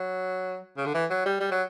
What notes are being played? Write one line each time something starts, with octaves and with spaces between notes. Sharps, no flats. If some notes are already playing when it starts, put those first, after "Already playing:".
Already playing: F#3
C#3
D3
E3
F#3
G3
G3
F#3